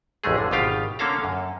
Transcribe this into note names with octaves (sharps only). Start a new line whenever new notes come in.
A1 F2 G#3 A3 G#4
D3
G#1 B2 F4 G4 F5
D3 A#3 C#4 A4 F5 A#5
F#2